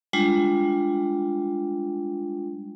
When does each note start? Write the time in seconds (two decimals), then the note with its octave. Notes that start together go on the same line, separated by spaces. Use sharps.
0.13 G3 G#3 D4 F4